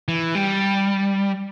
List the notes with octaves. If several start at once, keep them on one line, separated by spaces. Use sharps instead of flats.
E3
G3